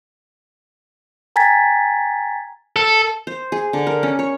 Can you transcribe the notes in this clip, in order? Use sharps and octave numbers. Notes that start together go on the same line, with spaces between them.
G5 G#5 A#5 G#6 A6 B6
A4
C5
G#4
D3
A#4
C#4
C#5